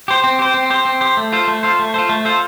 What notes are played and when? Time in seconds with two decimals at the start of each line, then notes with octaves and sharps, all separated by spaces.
0.08 G4 C5
0.24 C4
0.39 G4 C5
0.54 C4
0.70 G4 C5
0.85 C4
1.01 G4 C5
1.17 A3
1.32 F4 A4 C5
1.48 A3
1.63 F4 A4 C5
1.79 A3
1.94 F4 A4 C5
2.09 A3
2.25 F4 A4 C5